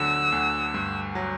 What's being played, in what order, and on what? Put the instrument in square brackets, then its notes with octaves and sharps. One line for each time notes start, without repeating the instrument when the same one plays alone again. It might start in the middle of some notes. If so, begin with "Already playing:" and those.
Already playing: [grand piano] D2 D3 F#3 [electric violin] E6
[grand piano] D2
G2
F#3